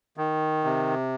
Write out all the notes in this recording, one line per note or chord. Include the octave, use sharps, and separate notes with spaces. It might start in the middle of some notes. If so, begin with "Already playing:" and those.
D#3
C3